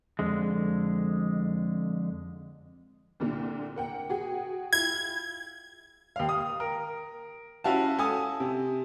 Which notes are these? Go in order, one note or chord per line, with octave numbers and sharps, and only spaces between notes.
F2 D3 G#3
C2 A#2 D3
A#3 F#5 G5
F#4 G#4 G5
E4 F4 G#6
D#2 F5
D#6
A#4
C#4 E4 F#4 F5 A5
A4 G#5 D#6
C3